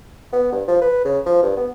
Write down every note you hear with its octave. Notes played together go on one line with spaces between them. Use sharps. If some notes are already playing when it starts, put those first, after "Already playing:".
B3
G2
F3
B4
C#3
F3
G2
B3